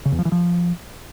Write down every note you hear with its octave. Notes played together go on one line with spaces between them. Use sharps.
C#3
E2
F3
E3
F3